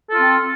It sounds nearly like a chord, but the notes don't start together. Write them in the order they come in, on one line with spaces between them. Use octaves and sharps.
A4 F4 C4